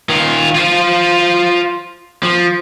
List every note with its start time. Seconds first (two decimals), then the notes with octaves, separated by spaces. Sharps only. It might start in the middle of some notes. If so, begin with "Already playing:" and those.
0.09 D#3 F4
0.55 F4 C5
2.23 F3